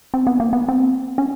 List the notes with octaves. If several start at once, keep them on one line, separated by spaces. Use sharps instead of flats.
C4
B3
A#3
B3
C4
C#4